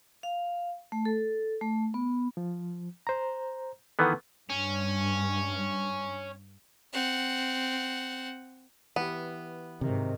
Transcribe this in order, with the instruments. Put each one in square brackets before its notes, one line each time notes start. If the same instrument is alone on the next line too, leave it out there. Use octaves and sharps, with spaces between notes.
[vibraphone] F5
A3
A4
A3
B3
[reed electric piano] F3
C5 A#5
[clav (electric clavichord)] D#3 E3 B3 [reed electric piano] A4 B4 F#5
[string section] G2 [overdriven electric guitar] C#4
[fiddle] C4 F#5
[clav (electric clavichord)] E3 G4 [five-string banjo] B3
[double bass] G#2 D#3 [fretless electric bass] C3